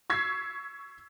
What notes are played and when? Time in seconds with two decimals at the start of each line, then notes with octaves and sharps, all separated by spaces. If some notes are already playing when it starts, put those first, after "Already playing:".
0.10 C#6 E6 G#6 B6 C7